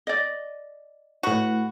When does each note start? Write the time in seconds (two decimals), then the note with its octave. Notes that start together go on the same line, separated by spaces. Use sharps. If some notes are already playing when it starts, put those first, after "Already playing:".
0.07 D5 D#5
1.23 A2 F#4 B4 C#7